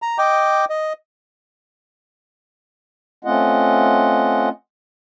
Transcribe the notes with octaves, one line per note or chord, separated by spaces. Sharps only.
A#5
D#5 G5 D6
D#5
A3 C4 C#4 F4 D#5 F#5